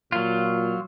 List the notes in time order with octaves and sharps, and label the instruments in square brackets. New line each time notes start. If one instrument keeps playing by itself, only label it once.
[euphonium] A#2 [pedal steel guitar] F#3 F4